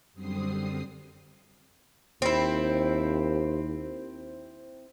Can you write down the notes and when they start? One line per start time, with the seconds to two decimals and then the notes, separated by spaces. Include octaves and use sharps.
0.13 F#2 D3 G3 C4 D#6 C7
2.22 D#2 C4 E4